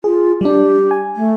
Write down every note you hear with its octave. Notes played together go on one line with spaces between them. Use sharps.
F4 G#4
G3 D4 G4
G#5
A3